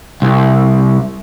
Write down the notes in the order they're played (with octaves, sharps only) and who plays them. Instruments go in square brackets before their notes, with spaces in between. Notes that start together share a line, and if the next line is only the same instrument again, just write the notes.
[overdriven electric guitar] C2